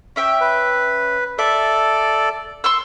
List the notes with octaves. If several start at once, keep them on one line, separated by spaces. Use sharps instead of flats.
C#4 E5 G5
B4
A4 D5 E5
C6 C#6 E6